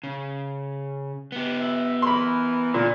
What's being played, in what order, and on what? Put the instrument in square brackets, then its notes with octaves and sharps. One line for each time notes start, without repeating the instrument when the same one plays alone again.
[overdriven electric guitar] C#3
B3 G4
[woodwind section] E5
[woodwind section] E3 A#4 [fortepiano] B5 C6
[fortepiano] A#2 [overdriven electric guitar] D3